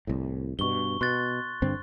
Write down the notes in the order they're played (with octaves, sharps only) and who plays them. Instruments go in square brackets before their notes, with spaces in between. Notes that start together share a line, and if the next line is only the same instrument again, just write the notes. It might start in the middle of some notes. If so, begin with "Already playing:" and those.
[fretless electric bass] C2 A2
[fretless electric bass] G2 B2 [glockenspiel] C#6 G7
[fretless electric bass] B2 [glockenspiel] C6 F#6 A6
[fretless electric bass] G2 D3 C4